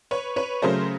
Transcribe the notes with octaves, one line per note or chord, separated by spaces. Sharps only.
B4 C#5
B4 C#5
C#3 F#3 A3 A#4 C5